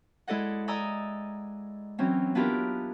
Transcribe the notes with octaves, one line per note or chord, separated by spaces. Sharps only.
G#3 E4 A4 D5 D#5 F#5
D5 D#5 G#5 A#5 D#6 E6
E3 F#3 C4 C#4
B3 D4 E4 F4 G4 A#4